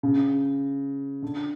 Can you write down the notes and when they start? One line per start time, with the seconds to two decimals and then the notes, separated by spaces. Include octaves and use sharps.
0.03 C#3
1.22 D3